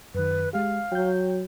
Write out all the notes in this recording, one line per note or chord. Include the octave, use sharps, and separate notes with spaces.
F#2 D#3 B4
G#3 G4 F5
F#3 G5 G6